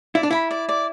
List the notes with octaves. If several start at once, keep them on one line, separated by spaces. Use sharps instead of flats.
E4 D5
D4
E4 B5
D5
D5